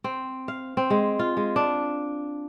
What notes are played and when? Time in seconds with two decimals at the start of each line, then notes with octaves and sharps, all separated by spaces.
0.04 C4
0.48 F5
0.77 C4
0.90 G#3
1.19 F4
1.37 G#3
1.56 D4